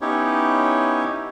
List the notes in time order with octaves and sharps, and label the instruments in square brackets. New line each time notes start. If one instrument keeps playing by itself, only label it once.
[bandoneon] B3 C#4 D#4 E4 G4 C#5